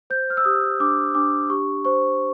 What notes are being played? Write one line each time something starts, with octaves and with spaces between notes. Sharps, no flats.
C5 G6
F6
E6
G4 D#6
D4 D6
D4 D6
G4 C#6
C5 C#6